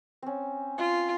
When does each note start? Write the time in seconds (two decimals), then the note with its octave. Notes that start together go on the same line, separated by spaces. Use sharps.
0.22 C4 C#4
0.78 F4